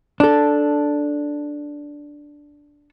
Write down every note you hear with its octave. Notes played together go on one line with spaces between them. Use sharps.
D4 A4